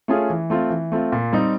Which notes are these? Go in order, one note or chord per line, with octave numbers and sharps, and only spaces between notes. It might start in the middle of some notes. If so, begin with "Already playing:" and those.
A3 C#4 F4 G#4
E3
A3 C4 F4
E3
A3 C4 F4
A#2
G3 C4 D#4